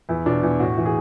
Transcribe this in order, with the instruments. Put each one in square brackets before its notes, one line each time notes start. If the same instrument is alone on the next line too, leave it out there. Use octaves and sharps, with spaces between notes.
[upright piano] E2 E4
B2 D4
E2 E4
A2 F#4
E3
G#4